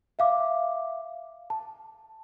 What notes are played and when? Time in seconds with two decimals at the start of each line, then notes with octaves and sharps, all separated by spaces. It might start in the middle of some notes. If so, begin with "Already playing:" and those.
0.19 E5 F5 D6
1.50 A5